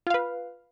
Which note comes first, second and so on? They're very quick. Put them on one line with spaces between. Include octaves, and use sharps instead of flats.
F4 F5 B4